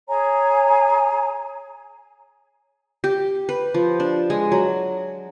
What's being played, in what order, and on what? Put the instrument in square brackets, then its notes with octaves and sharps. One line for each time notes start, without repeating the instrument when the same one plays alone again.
[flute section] G#4 C#5 G#5 A#5
[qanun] G4
B4
F3
D4
G#3
F#3